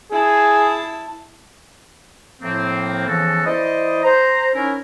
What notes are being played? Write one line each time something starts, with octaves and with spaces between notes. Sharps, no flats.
E4 G#4 A5
A2 F3 A#3 C4
C#3 E3 F3 B3 F#4 A4
E3 E4 C5 D5 D#5
C5 A#5
C#4 D#4 E4 A#4